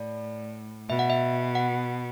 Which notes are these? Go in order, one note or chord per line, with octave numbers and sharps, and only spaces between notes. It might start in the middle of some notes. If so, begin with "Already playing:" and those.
Already playing: A2 D5
B2 E5
F#5
E5
F#5